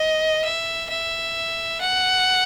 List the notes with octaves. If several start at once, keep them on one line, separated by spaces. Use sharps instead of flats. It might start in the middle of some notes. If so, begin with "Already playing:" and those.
Already playing: D#5
E5
E5
F#5